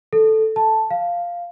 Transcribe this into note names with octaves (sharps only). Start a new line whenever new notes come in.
A4
A5
F5